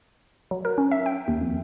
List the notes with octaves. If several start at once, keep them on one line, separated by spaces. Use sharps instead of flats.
F#3
A#4
C#4
E5
G5
D#2
F2